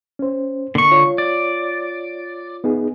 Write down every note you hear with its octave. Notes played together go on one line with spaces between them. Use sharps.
C#4 C5
D3 A#3 C#6
F4 C#5
D5
B3 D#4 G#4